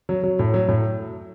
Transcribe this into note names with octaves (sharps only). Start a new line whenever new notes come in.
F#3
F#3
A2
F#3
A2